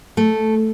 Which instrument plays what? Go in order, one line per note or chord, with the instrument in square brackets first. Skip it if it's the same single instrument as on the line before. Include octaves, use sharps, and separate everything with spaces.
[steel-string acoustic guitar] A3